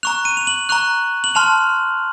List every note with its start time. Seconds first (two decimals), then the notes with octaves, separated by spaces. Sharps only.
0.03 A#5 C#6 F#6 F7
0.25 D#7
0.37 F7
0.47 F#7
0.69 A#5 C#6 F#6 F7
1.24 F#7
1.35 A5 C6 F6 F7